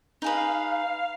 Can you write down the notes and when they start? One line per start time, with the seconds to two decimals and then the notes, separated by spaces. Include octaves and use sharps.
0.22 D#4 G#4 B4 F5